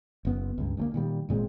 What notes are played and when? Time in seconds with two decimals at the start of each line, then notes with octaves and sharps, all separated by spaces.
0.25 F#1 B3
0.58 C#2 G2
0.77 D2 F3 A#3
0.94 A#2 D#3 G3
1.29 G#1 A#2 G#3 C4